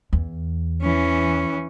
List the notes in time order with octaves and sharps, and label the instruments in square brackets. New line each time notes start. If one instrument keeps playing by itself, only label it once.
[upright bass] E2
[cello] E3 C#4